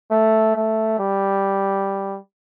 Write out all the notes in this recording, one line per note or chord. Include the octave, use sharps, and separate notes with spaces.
A3
A3
G3